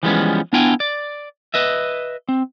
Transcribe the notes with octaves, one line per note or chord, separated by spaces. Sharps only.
E3 F3 G3 G#3 B3 C#4
B3 D4 E4 F4 G5 G#5
D5
B4 D#5 E5
C4